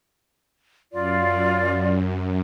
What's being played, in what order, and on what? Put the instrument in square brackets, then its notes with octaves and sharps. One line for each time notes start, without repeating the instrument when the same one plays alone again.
[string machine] F#2 [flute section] F4 D5